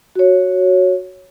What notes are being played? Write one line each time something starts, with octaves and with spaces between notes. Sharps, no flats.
F#4 C#5